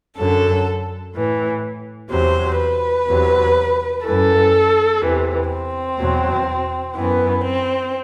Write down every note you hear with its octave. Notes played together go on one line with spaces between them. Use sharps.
F#2 D3 F#3 A4
A2 E3
E2 C3 F#3 C5
B4
E2 C3 F#3
F#2 E3 A4
E2 C3 E3
C4
E2 B2 F#3
F#2 E3 B3
C4